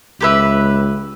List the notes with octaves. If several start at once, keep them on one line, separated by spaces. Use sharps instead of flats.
C#2 G4 B4 E5